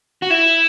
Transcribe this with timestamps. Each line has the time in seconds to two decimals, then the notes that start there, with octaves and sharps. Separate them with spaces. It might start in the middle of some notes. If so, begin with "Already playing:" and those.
0.22 F#4
0.30 E4